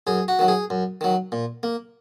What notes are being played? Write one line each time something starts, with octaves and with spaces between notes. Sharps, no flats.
F#2 G#4
F#4
D#3 F#3
G#4
F#2
D#3 F#3
A#2
A#3